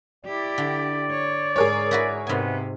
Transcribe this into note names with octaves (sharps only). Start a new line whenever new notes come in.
E4 G4 D5
D3
C#5
G#2 G#4 A#4 C#5
E4 F#4 B4
G#2 C3 B3 G#5